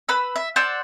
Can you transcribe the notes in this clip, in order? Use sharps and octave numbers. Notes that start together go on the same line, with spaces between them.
B4 B5 E6
E5
C5 D5 F#5 E6